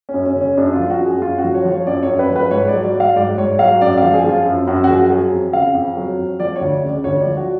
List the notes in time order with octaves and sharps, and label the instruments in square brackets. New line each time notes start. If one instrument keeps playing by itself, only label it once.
[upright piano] C#4
F#2
C#4
C#3
C#4
F#2 D4
F4
F3
F#4
F#2
G#4
F#2 F4
F#4
F3
C#5
F3
C#5
F#2 D5
C#5
F#2
B4
F3
B4
G#2 C#5
D5
F#3
D5
F#3
F5
G#2 D5
G#2 C#5
F#3 F5
F#2 D5
D5
F5
F3
G#4
F3 F4
F#2
F#2 F#4
F#4
F3 G#4
F#3 G#4
F2
C#3 F5
F2
F#3
F2
F3 D5
C#5
D2
C#3
D5
D2 C#5
D5
F3
F#4